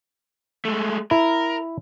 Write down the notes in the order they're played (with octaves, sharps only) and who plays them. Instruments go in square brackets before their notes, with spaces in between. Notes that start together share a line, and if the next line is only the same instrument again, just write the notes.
[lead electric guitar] G#3 A3
[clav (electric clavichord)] E4 [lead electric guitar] A#4